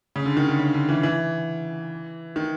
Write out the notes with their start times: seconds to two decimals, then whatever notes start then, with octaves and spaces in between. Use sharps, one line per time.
0.16 C#3
0.26 D3
0.37 D#3
0.48 D3
0.59 C#3
0.74 D3
0.89 E3
1.03 E3
2.36 D#3